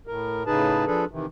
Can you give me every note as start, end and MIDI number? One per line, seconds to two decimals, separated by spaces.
0.07 0.43 45
0.07 0.43 70
0.46 0.85 45
0.46 0.85 49
0.46 0.85 63
0.46 0.85 68
0.46 0.85 71
0.46 0.85 81
0.86 1.05 53
0.86 1.05 62
0.86 1.05 68
0.86 1.05 69
0.86 1.05 71
1.11 1.26 48
1.11 1.26 51
1.11 1.26 52